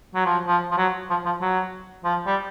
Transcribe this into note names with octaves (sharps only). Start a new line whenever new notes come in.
F#3
F3
F3
F3
F#3
F3
F3
F#3
F3
G3